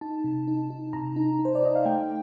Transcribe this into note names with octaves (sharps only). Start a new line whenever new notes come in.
D#4 A5
C3
D#4
D#4
C3 A#5
D#4
D#4
C5
D5
D#4 D#5
F5
A3 G5